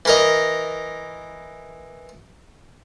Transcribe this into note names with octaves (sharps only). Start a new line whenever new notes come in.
E3 A#4 D#5